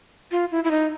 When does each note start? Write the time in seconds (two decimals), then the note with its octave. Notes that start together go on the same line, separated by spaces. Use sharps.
0.32 F4
0.51 E4
0.64 E4
0.71 D#4